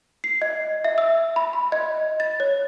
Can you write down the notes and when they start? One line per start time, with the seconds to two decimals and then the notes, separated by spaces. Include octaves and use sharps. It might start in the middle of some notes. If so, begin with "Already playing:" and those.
0.24 C7
0.42 D#5
0.85 E5
0.98 E6
1.36 B5
1.53 C6
1.72 D#5
2.20 A6
2.40 C#5